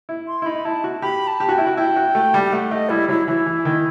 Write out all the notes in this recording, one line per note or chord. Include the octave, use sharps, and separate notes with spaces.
E4
C6
E4
D#4 B5
E4 A5
F#4
G4 B5
A5
G4
F#4 G5
E4
F#4
E4 G5
F#4
A3
G3
G5
A3 F#5
A3 D#5
G3 E4
F#3 E4
E3 E4
E3
D#3